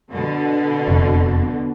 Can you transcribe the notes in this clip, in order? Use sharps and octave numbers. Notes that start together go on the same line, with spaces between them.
B2 D3
E1 F2 C3
B3